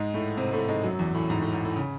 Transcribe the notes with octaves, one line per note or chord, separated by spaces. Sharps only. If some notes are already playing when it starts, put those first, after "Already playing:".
Already playing: G#2 G#3
A2 A3
C3 C4
A2 A3
G#2 G#3
F#2 F#3
E2 E3
A2
G#2
A2
G#2
A2
C#3